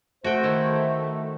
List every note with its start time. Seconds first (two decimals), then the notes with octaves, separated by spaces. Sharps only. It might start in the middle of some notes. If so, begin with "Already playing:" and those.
0.24 A3 F#4 C5 G5
0.43 D#3 E4